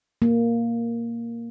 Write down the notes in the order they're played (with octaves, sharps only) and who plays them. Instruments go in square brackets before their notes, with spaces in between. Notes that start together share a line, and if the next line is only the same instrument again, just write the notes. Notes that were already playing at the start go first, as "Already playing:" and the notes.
[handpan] A#3